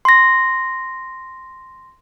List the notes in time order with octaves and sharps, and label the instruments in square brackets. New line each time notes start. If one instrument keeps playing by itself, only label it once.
[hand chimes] C6 A#6